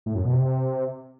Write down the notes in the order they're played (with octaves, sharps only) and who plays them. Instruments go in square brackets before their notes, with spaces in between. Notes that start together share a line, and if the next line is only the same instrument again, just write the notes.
[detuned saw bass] A2
F#2
B2
C3